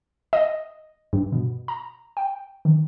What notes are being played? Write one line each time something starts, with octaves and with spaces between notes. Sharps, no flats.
D#5
G2
B2
A#5
G5
D#3